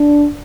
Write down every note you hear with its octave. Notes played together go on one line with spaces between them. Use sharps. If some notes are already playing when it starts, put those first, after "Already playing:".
Already playing: D4